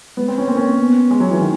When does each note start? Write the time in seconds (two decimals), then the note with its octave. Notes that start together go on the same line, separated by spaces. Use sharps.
0.17 G#3 B3
0.28 C4
0.38 C#4
0.48 A#3 C4
0.57 C#4
0.79 B3
1.11 G#3
1.20 F#3
1.31 E3
1.41 D#3